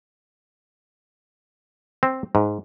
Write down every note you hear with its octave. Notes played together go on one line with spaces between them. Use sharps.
C4
G#2